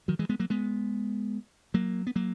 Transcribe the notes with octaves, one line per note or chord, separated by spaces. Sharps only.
D#3 F#3
E3 G#3
G#3 B3
F#3 A#3
G#3 B3
F#3 A#3
B3
F#3 A#3